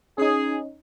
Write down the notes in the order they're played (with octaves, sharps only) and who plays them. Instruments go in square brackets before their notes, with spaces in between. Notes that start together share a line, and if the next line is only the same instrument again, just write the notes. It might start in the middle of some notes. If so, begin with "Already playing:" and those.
[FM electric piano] C#4 D#4 [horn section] G#4